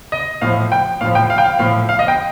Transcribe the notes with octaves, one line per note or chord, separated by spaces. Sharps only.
D#5
A2 F3 F5
G5
A2 F3 F5
G5
F5
G5
F5
A2 F3 F5
F5
D#5
G5